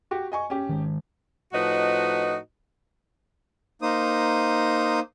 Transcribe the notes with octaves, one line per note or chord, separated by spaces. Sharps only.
F#4 G4
D#5 G#5 C#6
C#4 G4
D#3 G#3
A2 F3 D#4 F#4 B4 D#5
A#3 D#4 C5 D#6